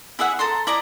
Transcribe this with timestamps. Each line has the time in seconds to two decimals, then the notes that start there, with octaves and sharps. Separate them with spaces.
0.19 E4 G#4 E5 F#5
0.39 A4 A5 A#5 C6
0.67 E4 D5 D#5 A#5